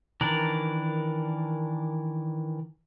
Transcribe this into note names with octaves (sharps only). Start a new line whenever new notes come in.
D#3 E3 D4 A#4 D5